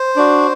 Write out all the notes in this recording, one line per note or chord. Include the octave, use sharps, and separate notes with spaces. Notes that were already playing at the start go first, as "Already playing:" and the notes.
Already playing: C5
D4 F#4